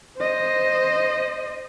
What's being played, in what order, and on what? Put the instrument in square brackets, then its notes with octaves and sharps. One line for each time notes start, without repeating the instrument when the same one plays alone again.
[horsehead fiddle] C5 D#5